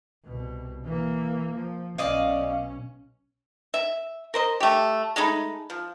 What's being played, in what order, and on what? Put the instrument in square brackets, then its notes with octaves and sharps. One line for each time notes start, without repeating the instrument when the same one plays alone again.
[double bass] C2 B2
E3 A#3
F3
[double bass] B1 C#4 [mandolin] D5 D#5 F5
[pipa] E5
A#4 C5 D#5
A3 G4
G#3 A3 D#4 B5
F3